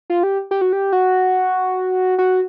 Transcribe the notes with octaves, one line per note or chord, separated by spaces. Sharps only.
F4
G4
G4
F#4
G4
F#4
F#4